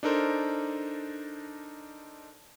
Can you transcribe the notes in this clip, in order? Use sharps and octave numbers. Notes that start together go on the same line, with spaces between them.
D4 D#4 A4 A#4 C5